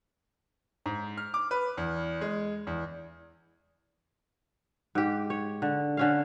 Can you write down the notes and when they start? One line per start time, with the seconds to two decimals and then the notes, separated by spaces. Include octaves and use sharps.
0.86 G#2
1.17 F6
1.34 D6
1.51 B4
1.77 E2
2.21 G#3
2.67 E2
4.95 G#2 G4
5.30 C#5
5.62 D3
5.97 D3 C#4 F5